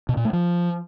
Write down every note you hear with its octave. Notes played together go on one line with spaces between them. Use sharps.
B2
A#2
A3
F3